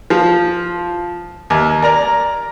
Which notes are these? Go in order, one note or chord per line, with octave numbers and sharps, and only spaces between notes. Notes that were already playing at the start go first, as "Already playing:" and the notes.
F3
D#2
A#4 D5 A#5